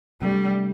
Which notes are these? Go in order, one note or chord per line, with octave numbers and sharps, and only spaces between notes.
C3 G3 A3 D4